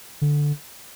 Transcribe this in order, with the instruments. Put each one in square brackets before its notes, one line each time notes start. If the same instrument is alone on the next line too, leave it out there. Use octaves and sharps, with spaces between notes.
[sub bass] D3